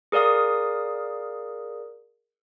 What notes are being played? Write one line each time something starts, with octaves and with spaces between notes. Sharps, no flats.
G#4 A#4 D5 F5 D#6